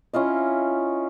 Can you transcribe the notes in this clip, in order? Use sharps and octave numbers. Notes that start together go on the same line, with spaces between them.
C#4 E4 F4 D#5